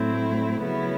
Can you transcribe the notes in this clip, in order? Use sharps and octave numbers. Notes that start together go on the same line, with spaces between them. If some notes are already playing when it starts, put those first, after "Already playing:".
Already playing: A2 F#3 A3 C4 E4
C#3 F#3 B3 E4